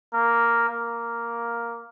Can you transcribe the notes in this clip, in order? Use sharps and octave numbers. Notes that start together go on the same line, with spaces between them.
A#3
A#3